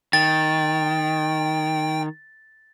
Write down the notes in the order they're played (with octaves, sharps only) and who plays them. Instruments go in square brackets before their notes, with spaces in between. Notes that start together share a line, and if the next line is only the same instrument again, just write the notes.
[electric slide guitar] D#3 [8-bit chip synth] G5 [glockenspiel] A6